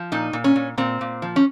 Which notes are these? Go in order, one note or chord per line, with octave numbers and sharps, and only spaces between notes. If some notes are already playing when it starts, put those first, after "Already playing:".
Already playing: F3
A#2 D#4
A#2
C#4
A#2
A#2 C4
A#2
F3
C#4